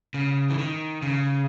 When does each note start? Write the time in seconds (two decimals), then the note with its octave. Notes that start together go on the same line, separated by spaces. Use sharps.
0.14 C#3
0.50 E3
0.58 D#3
1.02 C#3